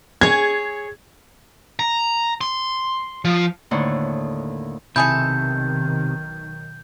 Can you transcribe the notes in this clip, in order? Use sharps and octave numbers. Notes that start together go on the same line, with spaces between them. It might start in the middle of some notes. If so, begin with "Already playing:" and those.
G#4 C#5 G#6
A#5
C6
F3
D#2 A2 D3 C5 C#5
B1 C3 D#3 E4 G#4 A4 G6